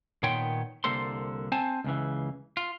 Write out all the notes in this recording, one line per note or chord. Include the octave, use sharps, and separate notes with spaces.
A#2 D#3 B3 C#5 G5 C6
C2 D3 A#3 A4 C5 C6
C4 C5 G#5 A5
C#2 C#3 E3
F4